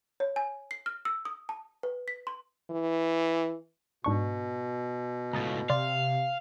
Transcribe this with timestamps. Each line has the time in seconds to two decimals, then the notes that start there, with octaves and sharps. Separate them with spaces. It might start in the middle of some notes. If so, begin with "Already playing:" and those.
0.20 C#5
0.36 G#5
0.71 C7
0.86 F6
1.05 E6
1.25 D#6
1.49 A5
1.83 B4
2.08 B6
2.27 C6
2.71 E3
4.04 G#2 B2 D4 C#6
5.33 C#2 A2 A#5 D#6 A6
5.70 C3 D5 F5 C6